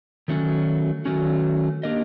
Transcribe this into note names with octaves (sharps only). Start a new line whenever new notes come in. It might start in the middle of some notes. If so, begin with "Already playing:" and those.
D#3 F#3 A3 C#4 F#4
D#3 F#3 A3 C#4 F#4
A#3 D4 G4 A#4 D#5